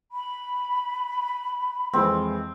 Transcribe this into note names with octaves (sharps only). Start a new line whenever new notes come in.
B5
F2 E3 G#3 C4